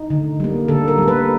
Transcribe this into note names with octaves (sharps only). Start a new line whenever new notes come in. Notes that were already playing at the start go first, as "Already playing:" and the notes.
Already playing: D#4
D3
G3 A#3
D3 A4
A#4
G3 A#3
B4